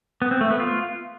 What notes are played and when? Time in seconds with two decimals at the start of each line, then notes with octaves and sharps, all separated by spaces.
0.22 B3
0.31 C4
0.41 A3
0.50 B3
0.60 F4